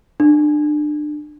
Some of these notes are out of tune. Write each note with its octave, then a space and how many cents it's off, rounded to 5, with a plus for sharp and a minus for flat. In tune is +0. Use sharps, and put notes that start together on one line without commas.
D4 +30